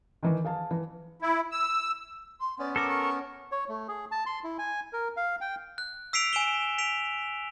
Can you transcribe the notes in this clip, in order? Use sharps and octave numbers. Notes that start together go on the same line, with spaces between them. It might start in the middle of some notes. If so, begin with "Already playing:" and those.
D#3 E3
G#4 F5 A5
E3
E4
E6
C6
B3 C#4 D5
A4 A#4 D6
C#6
C#5
A3
G#4
A5
C6
E4
G#5
A#4
F5
G5
F#6
E6 B6 C7 D7 F7
G#5 D7 E7 G7
B6 D7 F7